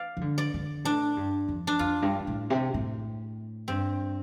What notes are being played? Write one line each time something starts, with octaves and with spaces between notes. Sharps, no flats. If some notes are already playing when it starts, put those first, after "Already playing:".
Already playing: D5 F5
F3
D3
D5
D3
A2 D4
G2
F2
D4
F2 F4
G2
G2
A2
C3
A2
G2 C4